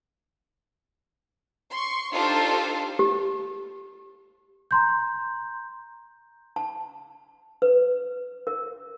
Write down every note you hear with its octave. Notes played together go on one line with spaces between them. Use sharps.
C6 C#6
D4 D#4 F4 G4 A4 C5
G4
A#5 C6 G6
A5
B4
A#4